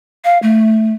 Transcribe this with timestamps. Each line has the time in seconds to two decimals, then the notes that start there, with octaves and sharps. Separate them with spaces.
0.24 F5
0.43 A3